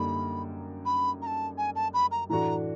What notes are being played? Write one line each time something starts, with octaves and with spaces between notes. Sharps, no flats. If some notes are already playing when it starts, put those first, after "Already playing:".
Already playing: F#2 D3 G3 A#3 D#4 B5
B5
A#5
A5
G#5
A5
B5
A#5
A2 E3 A3 D4 F#4 A#5